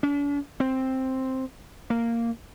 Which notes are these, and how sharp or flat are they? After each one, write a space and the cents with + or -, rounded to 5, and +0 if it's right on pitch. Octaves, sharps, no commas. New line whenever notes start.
D4 -45
C4 +5
A#3 -10